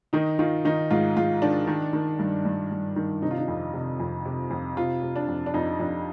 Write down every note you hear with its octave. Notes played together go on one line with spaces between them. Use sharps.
D#3 D#4
D#3 F4
D#3 D#4
G#2 F4
G#2 F4
D#3 D4
D#3
D#3
G2
G2
G2
D#3
C3 D#4
F4
D#4
F2
C3
F2
C3
F2
C3 F4
C3
D4
F2
D4
F2 D#4
F2 D4